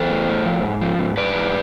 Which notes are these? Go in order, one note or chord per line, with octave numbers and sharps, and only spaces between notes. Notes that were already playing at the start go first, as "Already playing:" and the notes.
Already playing: E3 A4 C5
A2
A2
F3
G#2
F3
G#2
G#2 B4 D5
E3